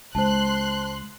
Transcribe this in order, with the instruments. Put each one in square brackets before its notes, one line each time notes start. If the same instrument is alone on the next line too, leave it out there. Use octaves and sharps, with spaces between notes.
[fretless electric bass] C#2 [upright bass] G#3 [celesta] C5 A5 [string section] C6 F#6